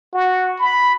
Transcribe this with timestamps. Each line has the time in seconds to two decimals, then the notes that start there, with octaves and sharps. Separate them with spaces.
0.13 F#4
0.59 B5